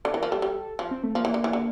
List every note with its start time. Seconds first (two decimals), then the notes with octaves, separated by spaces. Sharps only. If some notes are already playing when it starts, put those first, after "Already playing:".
0.05 D3 A4
0.14 E3
0.17 A#4
0.23 F3
0.30 G3 A4
0.42 G3
0.79 F3
0.91 C4
1.03 A3
1.15 F3 A#3
1.25 E3
1.34 D3
1.44 E3
1.53 D3